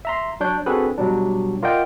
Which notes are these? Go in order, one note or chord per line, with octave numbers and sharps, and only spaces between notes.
E5 A#5 C6
F#3 D4 C#5 G6
C4 D4 F#4 G#4 A4 B4
B2 F#3 G3 D4
F4 A#4 D5 D#5 F#5 G5